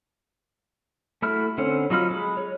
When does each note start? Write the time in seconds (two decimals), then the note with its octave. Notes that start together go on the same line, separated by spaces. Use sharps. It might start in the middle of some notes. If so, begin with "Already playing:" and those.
1.22 A3 E4 F#4 B5 F6
1.58 D3 C4 C#4 F#5
1.90 F#3 D#4 F4 B5 F6
2.10 G#3 B5
2.37 C#5